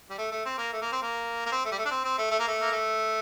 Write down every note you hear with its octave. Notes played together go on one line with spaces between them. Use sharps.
G3
A3
A3
C4
A#3
A3
A#3
C4
A#3
A#3
C4
A3
G3
A3
D4
C4
C4
A3
A3
A#3
A3
A#3
A3